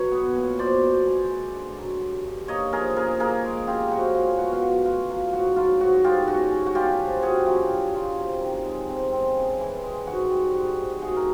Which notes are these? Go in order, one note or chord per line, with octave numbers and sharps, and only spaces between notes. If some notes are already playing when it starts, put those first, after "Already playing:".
Already playing: F#3 B4 C#5
B3
A#2
B2 C5 D5
B2
G#3
G#3
D3
F#3
G2
G2
A#3 C#5 D#5
F3 G#4 A#4
C#3 G#4 A#4
A#3 G#4 A#4
G#3
C#3 F4 G4
F3 F#4
G#3 F4
B3 F#4
F4
A2 F#4
A2 F4
F#3 F4
G#2 F#4
F#3 F4
G#2 F#4
G#2 F4 G4
C#4 F#4
C#4
F#4
A3 F4 G4
F3
D4 F#4 G#4
F#3 F4 G4
D4
F#3 F4
C3
D#3
G#3
C4
C4
C#3
E3
G#3
G#2 F#4
G3
G#2
G#2
A3 F#4 G#4
A#4